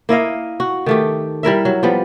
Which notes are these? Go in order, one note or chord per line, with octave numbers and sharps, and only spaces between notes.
A#3 E4 D#5 F5
F#4
D#3 A3 G4
G3 E4 A#4 E5
F#3
F3 G3 B3